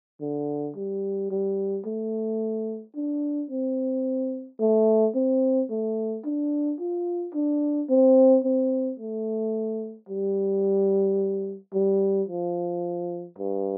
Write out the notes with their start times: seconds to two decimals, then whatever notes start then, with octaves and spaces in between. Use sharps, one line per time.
0.21 D3
0.76 G3
1.31 G3
1.86 A3
2.96 D4
3.51 C4
4.60 A3
5.15 C4
5.70 A3
6.25 D4
6.80 F4
7.35 D4
7.89 C4
8.44 C4
8.99 A3
10.09 G3
11.74 G3
12.28 F3
13.38 G2